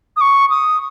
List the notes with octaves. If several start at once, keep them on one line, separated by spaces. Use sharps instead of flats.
D#6
C#6
D#6